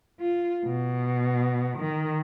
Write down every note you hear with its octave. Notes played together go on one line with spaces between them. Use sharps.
F4
B2
D#3